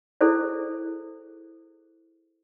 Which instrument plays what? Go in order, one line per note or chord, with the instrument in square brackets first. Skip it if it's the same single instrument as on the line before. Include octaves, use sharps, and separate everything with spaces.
[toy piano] E4 G#4 A4 C5 D5